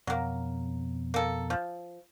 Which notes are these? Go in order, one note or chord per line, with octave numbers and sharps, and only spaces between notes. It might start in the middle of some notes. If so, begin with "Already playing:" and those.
F2 B2 F#3 A#3
A#3 A4
F3